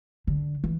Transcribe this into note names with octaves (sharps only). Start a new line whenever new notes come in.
D3
E3